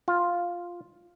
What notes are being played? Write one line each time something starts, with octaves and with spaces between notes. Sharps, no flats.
F4